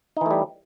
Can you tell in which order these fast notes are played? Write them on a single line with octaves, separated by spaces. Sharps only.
D#4 E3 A3 G3